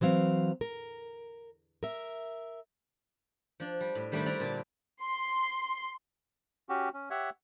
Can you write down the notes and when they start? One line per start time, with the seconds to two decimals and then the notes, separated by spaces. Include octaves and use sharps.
0.01 E3 F#3 C4 F5
0.61 A#4
1.83 A#4 E5
3.60 F3 D4
3.80 G3
3.95 A2
4.12 D#3 G3 A3 D4 E4 C5
4.26 D4 E4 D5 A#5
4.40 A#2 D3 A5
5.03 C6
6.69 C#4 F#4 G4
6.94 C#4
7.10 G4 C#5 E5 F#5